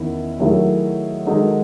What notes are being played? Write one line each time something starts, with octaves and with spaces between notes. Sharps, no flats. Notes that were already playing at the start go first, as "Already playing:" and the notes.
Already playing: E2 D#3 C#4 E4
D#3 F#3 A3 E4 G#4
D#3 G#3 D#4 F#4 A4